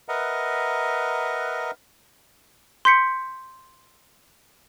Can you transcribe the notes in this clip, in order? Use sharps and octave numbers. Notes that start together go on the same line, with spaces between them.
A#4 B4 D#5 E5 F#5 A#5
C6 G6 B6 C#7